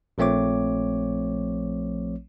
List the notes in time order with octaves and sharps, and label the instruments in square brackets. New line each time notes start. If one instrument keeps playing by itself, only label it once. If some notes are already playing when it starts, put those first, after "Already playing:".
[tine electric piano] A#1 F3 A3 C4 C#5 D6